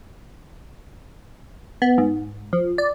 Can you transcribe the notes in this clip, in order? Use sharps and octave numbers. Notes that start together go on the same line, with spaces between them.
B3
G#2
F3
D5